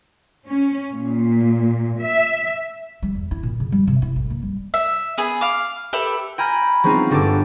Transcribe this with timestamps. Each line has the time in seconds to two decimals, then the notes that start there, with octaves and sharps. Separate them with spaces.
0.47 C#4
0.93 A#2
1.99 E5
3.02 G3
3.15 E2
3.31 E4
3.43 A#2
3.60 C#3
3.72 G3
3.87 C3
4.02 E4
4.16 A1
4.30 A#3
4.43 G3
4.74 E5
5.18 B3 G#4
5.41 F5 D6
5.93 G4 A4 B4 E5
6.38 G5 G#5 A#5 B5 F6 G#6
6.84 F#3 G#3 B3 C4 D#4 F4
7.10 G1 G3 B3 A4 D6